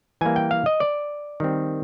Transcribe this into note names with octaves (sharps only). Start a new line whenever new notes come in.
E3 G3 A#3 G#5
G5
F5
D#5
D5
D#3 G3 C4